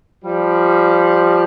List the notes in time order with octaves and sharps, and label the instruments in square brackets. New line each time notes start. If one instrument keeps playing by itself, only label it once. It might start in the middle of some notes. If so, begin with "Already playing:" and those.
[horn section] F3 G3